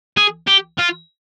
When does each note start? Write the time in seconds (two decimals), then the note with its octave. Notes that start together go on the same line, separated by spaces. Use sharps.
0.17 G#4
0.47 G4
0.79 F4